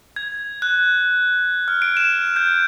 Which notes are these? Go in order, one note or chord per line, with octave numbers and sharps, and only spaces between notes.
G#6
F#6
F6
D7
E7
G6